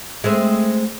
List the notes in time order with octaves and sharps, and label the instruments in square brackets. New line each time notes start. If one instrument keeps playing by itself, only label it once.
[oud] G#3 A3 C4